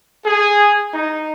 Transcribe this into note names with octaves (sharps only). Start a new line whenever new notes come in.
G#4
D#4